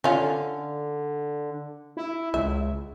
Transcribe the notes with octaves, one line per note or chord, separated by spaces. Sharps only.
D3 C#4 F4
E4
C#2 E5